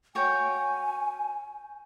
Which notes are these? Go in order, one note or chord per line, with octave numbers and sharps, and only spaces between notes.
F#4 C#5 G5 G#5